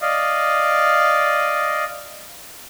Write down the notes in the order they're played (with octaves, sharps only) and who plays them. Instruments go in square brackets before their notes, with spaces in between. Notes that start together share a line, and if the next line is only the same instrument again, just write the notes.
[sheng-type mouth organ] D5 D#5 F5